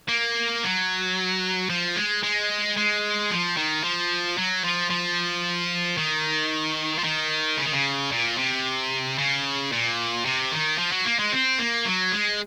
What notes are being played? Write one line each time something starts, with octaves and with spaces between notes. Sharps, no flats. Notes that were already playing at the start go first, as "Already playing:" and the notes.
A#3
F#3
F3
G#3
G#3
G#3
F3
D#3
F3
F#3
F3
F3
D#3
F3
D#3
C#3
D#3
C#3
A#2
C3
C#3
A#2
C3
D#3
F3
F#3
A#3
G#3
C4
A#3
F#3
G#3